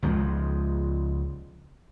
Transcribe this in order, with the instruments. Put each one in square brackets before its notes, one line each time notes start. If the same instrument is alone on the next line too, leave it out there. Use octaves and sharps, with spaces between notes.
[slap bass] C#2 F3 G#3